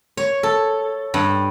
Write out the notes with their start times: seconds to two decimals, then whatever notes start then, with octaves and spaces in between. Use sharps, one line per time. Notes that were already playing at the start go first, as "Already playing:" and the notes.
0.17 C#5
0.43 A4
1.14 G2